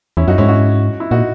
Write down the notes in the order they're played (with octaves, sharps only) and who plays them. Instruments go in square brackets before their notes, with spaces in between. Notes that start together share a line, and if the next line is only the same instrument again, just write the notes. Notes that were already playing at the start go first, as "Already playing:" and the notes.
[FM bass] E2 [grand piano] C#4 E4
[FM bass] F#2 [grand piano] D#4 F#4
[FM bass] G#2 [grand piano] C#4 E4
[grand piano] D#4 F#4
E4
[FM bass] A#2 [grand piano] D#4 F#4